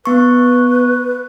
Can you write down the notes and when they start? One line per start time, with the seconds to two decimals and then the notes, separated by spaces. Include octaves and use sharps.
0.05 B3 B4 C#6